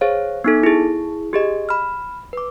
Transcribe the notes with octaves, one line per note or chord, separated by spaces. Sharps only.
G#4 C5 C#5 F5
B3 D#4 A4
E4 G#4
G4 G#4 D#5
B5 F6
B4 D6